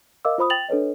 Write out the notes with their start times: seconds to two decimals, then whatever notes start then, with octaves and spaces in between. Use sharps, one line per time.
0.25 A#4 D#5 F5 D6 E6
0.38 F4 C5 B5 D#6
0.50 G5 A6 F7 F#7
0.69 D4 A4 B4 C#5 D#5